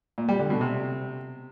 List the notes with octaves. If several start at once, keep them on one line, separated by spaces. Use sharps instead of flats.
A#2
G3
D3
B2
C3